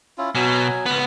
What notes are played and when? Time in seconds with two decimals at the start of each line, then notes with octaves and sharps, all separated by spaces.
0.18 C#4 E4 F4
0.35 B2 F#3 G#5
0.86 C#2 B3